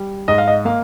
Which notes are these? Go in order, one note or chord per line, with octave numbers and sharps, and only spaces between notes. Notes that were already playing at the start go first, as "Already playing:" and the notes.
Already playing: G3
G#2 D#5
F5
D#5
A#3 F5